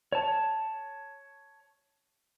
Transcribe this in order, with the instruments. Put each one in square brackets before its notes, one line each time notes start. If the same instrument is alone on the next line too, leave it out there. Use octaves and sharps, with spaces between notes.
[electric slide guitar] C#5 A5